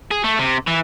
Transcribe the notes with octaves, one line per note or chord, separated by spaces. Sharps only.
G#4
A3
C3
E3